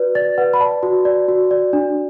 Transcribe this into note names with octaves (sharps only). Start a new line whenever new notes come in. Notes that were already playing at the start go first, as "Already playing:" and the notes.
Already playing: F#4 B4 D5
D5 A6
B4 F#5
B5
D5 A5
F#4
D5
F#4
D5
D4